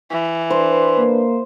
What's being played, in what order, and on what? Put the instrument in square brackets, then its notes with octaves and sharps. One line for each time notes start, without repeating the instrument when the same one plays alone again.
[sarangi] E3
[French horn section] D4 B4 [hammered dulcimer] C5
[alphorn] A#3